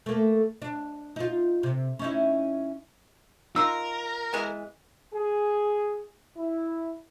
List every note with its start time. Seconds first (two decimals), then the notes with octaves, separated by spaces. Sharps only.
0.06 A3 A#3
0.62 D4
1.16 D#4 F4
1.63 C3
1.99 C#4 D#4 E4
3.56 D#4 F4 A#4 E6
4.33 E3 G#3 B3
5.14 G#4
6.37 E4